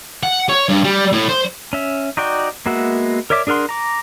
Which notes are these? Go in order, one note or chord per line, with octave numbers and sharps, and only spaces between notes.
F#5
C#5
G2
G3
A2
C5
C#4 E5
D#4 F#4 D5 G5
G#3 A#3 B3 F#4 E5
A#4 C#5 D5 E5 D6
D4 G#4 A#4 F#5 C6
A#5 D6